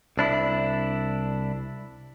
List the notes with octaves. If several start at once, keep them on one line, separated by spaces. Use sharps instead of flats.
C2 D4 E4